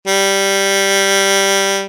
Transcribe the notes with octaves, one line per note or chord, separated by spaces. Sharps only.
G3